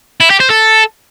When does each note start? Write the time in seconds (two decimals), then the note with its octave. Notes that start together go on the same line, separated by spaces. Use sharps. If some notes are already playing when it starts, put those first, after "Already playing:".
0.20 E4
0.30 G4
0.40 C5
0.50 A4